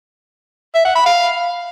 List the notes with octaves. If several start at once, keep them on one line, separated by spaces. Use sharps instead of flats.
E5
F#5
B5
F5